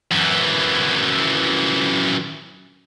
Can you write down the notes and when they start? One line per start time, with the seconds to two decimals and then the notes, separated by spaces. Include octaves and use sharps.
0.12 F#2 E3